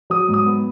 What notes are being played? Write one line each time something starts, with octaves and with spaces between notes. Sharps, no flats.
F#3 D#6
G#2
D#6
B3